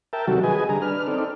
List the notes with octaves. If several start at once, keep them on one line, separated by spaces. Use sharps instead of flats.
A#4 E5 G5 A5
C3 D#3 F#3 G3 F#4 A4
G#4 B4 D#5 G#5
D3 G3 A#5
D4 B4 F6
C4 D#4 A4 D5